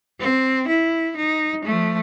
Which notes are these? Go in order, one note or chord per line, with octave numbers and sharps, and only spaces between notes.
C4
E4
D#4
F3 A3